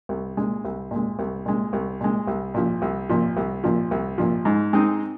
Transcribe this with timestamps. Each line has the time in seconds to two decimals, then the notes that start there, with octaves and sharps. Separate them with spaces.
0.09 C2
0.37 A#2 G#3
0.65 C2
0.91 A#2 G#3
1.19 C2
1.46 A#2 G#3
1.73 C2
2.01 A#2 G#3
2.27 C2
2.54 A#2 F3
2.82 C2
3.09 A#2 F3
3.37 C2
3.64 A#2 F3
3.91 C2
4.18 A#2 F3
4.45 G#2
4.73 G#3 C4 D#4